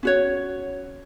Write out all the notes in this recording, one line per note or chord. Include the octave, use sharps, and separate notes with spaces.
C#4 F#4 C#5